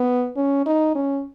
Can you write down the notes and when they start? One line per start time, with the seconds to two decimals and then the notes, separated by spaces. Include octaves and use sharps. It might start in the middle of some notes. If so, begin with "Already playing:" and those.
Already playing: B3
0.36 C#4
0.66 D#4
0.95 C#4